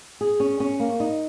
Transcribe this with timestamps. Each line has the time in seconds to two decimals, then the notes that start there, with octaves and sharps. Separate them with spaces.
0.21 G#4
0.40 C#4
0.60 C#4
0.80 A#3
1.00 D#4